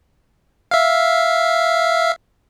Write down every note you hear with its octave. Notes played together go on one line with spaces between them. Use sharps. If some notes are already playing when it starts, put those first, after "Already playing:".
E5 F5